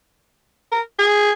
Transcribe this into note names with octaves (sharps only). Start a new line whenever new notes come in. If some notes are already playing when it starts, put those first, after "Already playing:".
A#4
G#4